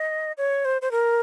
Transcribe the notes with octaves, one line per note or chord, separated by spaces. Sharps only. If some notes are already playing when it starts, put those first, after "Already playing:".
Already playing: D#5
C#5
C5
C5
A#4